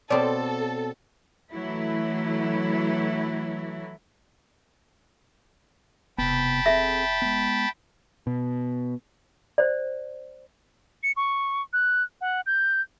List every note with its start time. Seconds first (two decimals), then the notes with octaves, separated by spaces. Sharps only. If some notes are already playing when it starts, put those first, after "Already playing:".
0.10 B2 C4 A4 C#5 D5 D6
1.51 E3 F#3 A3 E4
6.18 E1 C3 B3 G5 A5 B5
6.66 C4 G#4 A4 E5
7.22 G#3 B3
8.27 B2
9.58 C5 D5
11.03 C#7
11.17 C#6
11.73 F#6
12.21 F#5
12.46 G6